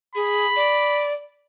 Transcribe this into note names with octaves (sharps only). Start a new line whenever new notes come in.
G#4 B5
D5